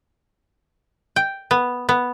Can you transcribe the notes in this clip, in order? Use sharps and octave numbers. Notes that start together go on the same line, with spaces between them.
G5
B3
B3